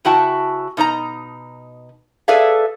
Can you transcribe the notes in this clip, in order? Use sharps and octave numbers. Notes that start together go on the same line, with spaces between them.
C#3 E4 F#4 G5 A5
B2 D#4 C#5 A#5
G#4 A4 B4 D5 E5 F5